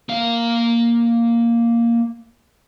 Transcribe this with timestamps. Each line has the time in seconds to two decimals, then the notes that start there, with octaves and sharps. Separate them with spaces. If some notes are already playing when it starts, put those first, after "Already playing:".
0.09 A#3 F5